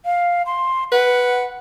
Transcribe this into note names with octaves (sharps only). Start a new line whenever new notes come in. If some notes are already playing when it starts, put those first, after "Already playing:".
F5
C6
B4 F#5